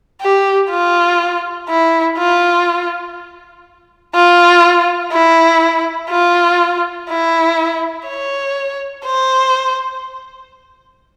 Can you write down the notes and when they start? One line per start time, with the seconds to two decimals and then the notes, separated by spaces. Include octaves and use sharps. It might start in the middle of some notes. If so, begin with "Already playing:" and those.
0.22 G4
0.70 F4
1.69 E4
2.18 F4
4.15 F4
5.12 E4
6.10 F4
7.10 E4
8.08 C#5
9.06 C5